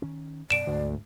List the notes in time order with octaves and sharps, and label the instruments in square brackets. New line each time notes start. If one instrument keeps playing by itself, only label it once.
[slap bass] D#3 C#4
[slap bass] F#2 B2 [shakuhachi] D5 [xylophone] D7 E7
[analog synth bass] D2 [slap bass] G#2